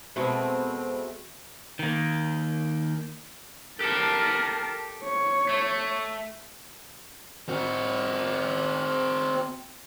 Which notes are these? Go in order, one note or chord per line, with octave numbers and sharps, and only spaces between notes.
B2 G#3 A3 C4
D#3 A#3
G4 A4 A#4 A5
C#5
A3
C4 F#4